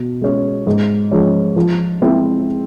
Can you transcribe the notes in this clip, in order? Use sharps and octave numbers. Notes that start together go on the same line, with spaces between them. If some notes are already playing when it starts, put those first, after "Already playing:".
Already playing: B2
G#3 C#4
G#2
F3 G#3 C#4
F3
G#3 C4 E4